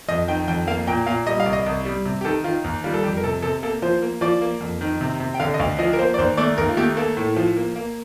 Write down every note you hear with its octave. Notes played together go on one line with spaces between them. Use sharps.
F2 D#5
D#3 G5
F2 G5
A#3 F5
A#2 G5
A#2 F5
G3 D#5
F5
C2
D#5
C2
G3
C3
G4
D#3 A4
D#3 F4
D#2
G3 F4
A4
F2 G4
A#4
C3 A4
C3 A4
A#3 A4
F3 C5
A#3
F3 D5
A#3
F2
D#3
C3
C3
G5
D3 F5
D#5
D2 F5
F3 D#5
A#4
A#3 C5
D5
D#2 C5
A3 D5
D#2 A#4
F4
A3 G4
A#3 A4
A2
F3
A#3
A#3